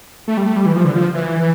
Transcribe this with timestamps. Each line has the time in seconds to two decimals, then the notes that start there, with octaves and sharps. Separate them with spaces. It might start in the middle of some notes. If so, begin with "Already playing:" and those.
0.28 A3
0.37 G3
0.47 A3
0.56 G3
0.66 E3
0.75 F3
0.85 D3
0.95 F3
1.14 E3